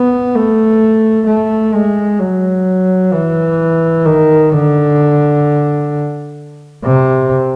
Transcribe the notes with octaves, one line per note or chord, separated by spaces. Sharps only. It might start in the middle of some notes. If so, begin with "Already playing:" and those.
Already playing: B3
A3
A3
G#3
F#3
E3
D#3
D3
C3